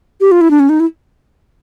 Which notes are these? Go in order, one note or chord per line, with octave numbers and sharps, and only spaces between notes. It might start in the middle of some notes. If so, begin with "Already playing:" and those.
G4
F4
E4
D4
C#4
D#4
E4